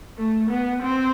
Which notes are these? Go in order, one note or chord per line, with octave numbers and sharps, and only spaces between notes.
A3
B3
C4